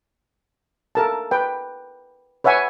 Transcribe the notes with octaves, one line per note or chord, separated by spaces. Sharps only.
A4 A#4 A5
B4 G5
B4 C#5 E5 F#5 G#5